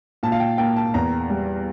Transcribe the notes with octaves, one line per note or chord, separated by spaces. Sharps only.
A#2 A5
F5
G5
A#3 G5
A5
E2 A#5
G3